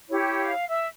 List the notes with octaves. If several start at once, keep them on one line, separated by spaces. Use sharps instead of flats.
E4 G4 C#5
F5
E5